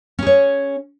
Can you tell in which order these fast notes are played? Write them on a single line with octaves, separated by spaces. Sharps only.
C#4 G#4 C#5